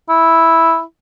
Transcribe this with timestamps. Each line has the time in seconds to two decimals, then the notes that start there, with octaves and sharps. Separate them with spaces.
0.09 E4